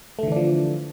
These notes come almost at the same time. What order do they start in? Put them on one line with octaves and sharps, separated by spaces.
A3 D3 E3 D4 F3